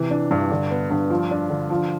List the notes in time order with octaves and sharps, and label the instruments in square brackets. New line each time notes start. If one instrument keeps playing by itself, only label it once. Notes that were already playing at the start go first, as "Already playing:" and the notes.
Already playing: [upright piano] C3 E3
D4
G2
D3
B3
G2
F3
D4
D3
F3